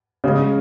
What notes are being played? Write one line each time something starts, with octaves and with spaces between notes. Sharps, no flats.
C#3 G#3